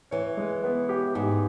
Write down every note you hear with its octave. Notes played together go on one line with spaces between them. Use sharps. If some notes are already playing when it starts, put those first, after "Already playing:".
E3 C#5
G#3
B3
G4
G#2 G4